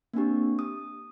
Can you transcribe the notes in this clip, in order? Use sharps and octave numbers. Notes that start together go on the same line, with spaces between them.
A#3 C4 D4 G4
D#6